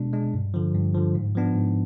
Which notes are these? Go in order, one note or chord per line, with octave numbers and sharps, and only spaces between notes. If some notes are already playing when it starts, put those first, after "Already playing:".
Already playing: B2 G#3 D4
G#3 D4
G2
D3 F3
G2
D3 F3
G#2
F3 B3 D4
G#2